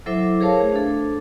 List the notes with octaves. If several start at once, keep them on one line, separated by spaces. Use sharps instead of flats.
F#3 E4 A4 C5 E5 D6
G#4 A#4 C5 C#5 F5 A5
A3 G#4
D4 A4